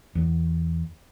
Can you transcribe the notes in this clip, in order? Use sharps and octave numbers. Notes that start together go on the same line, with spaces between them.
E2